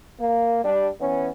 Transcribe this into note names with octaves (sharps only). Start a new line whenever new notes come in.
A#3
G3 D4
E3 B3 C#4